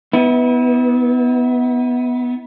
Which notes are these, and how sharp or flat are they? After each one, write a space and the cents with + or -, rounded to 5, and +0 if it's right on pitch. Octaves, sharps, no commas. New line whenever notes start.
B3 +0 E4 -35